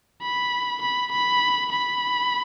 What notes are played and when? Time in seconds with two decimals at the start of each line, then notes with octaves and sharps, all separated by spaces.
0.22 B5
0.82 B5
1.12 B5
1.72 B5